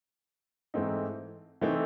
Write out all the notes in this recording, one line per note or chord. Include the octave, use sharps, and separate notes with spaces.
G#2 E3 A3 C4 D#4
E3 A3 C4 D#4